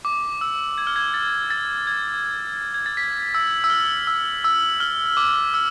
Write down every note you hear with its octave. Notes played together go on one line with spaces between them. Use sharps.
D6
E6
G#6
F6
G#6
A6
A6
G#6
G#6
A6
B6
E6
E6
F6
E6
E6
F6
D6
E6